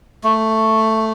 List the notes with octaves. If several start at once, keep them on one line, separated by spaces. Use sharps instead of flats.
A3